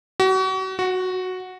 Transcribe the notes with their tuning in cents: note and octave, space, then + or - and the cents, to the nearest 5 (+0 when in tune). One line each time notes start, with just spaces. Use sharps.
F#4 +35
F#4 -5